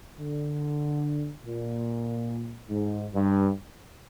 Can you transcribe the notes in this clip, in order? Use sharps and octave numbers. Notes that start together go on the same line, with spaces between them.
D3
A#2
G#2
G2